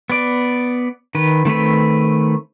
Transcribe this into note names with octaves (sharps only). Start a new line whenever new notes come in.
B3 D5
D#3 B4
D#3 A3 C4 B4